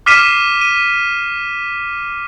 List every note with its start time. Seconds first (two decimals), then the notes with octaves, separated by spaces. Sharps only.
0.06 D6 F6 B6 C7 D#7 E7
0.61 D#7